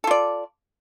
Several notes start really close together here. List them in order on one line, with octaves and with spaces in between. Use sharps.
A4 F4 D5